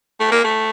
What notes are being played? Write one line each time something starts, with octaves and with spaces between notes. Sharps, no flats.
A3
A#3
A3